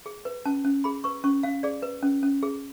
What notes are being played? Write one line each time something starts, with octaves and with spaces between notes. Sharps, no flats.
G#4
B4
C#4 A5
C#4
G#4 B5
B4 C#6
C#4 C#6
C#4 F5
G#4 D5
B4
C#4
C#4
G#4